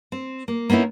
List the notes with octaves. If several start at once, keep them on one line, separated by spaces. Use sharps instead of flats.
C4
A#3
A#3 B3 C#4 D#4 E4